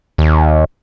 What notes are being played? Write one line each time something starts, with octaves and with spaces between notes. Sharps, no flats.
D#2